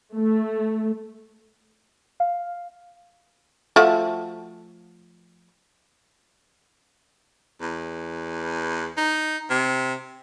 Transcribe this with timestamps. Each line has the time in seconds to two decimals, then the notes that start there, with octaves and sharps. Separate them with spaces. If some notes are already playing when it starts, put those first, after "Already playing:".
0.14 A3
2.20 F5
3.76 F3 A3 F#4
7.61 E2
8.98 D#4
9.50 C3